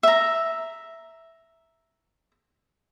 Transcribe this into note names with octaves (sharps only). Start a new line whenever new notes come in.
E5 A#5